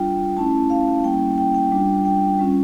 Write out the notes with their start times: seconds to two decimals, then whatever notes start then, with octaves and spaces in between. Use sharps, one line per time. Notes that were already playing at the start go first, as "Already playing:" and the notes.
Already playing: G3 D4 F4 G5
0.36 A3 C#4 E4 A5
0.70 F5
1.04 G3 A#3 C#4 E4 G5
1.38 G5
1.55 G5
1.72 G3 D4 F4
2.05 G5
2.39 G3 C#4 F4